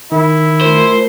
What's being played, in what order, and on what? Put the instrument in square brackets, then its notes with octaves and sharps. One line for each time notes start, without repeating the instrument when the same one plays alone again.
[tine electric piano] D#3 [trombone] E4
[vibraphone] A3 F4 A#4 [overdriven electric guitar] C5